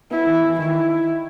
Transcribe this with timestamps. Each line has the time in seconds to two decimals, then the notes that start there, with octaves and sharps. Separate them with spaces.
0.11 B3 E4
0.26 E3
0.42 E3
0.58 D#3 E4